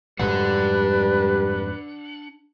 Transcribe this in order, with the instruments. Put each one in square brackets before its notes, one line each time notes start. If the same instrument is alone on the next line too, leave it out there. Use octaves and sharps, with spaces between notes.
[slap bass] F2 G#2 F#3 [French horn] G3 [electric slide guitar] D4 F#5 [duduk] B4